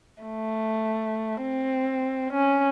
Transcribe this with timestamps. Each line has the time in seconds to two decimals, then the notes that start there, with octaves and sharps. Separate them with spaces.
0.23 A3
1.43 C4
2.33 C#4